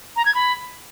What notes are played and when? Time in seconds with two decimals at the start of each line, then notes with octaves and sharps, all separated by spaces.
0.16 A#5
0.26 G#6
0.35 B5